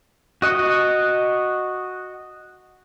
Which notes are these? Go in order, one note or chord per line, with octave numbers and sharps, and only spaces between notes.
F#4 D#5 F#5